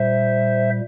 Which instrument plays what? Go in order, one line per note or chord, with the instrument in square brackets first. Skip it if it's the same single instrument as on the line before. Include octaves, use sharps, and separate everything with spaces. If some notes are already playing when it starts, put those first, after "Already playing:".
Already playing: [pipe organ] A#2 G3 C5 E5